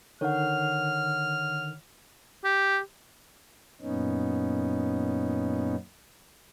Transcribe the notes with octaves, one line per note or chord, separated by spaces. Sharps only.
D3 D#3 C#5 F#5 F6
G4
F#2 A#2 B3 C#4 D#4